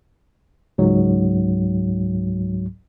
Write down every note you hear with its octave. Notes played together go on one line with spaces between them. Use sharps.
C#2 G#2 F#3